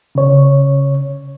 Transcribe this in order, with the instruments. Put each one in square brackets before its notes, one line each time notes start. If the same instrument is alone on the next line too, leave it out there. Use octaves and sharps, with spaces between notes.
[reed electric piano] C#3 C#5